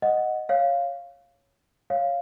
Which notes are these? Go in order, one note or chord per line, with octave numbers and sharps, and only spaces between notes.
D#5 F#5
C#5 F5
C#5 F5